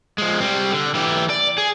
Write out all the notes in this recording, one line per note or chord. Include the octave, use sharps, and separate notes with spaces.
F3 G#3
G3 C4
D3
E3 G4
D5
G#4